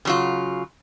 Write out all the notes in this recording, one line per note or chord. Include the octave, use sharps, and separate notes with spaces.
C#3 F#3 F4